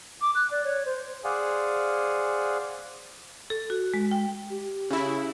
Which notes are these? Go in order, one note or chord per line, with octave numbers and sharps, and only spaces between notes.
D6
F#6
D5
C#5
C5
G#4 C5 D5 F5 F#5 G#5
A4
F#4
G#3
G5
G4
C#3 E4